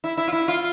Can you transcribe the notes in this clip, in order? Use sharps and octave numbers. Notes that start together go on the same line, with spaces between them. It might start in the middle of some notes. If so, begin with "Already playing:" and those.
E4
E4
F4
E4
F4